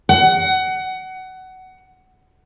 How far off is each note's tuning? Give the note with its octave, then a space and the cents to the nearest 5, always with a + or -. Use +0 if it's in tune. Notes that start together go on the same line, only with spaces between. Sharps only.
F#5 +20